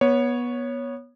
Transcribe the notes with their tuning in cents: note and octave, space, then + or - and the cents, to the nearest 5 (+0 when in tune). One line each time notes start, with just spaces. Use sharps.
B3 -20 C#5 +0